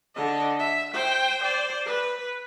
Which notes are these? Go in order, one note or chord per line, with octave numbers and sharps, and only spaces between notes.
D3 D#5
E5
C5 G5
C5 D5
B4